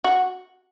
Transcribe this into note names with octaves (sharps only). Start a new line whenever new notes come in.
F#4